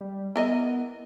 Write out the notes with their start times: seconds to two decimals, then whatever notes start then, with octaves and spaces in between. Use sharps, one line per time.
0.01 G3
0.36 B3 E4 A#4 D#5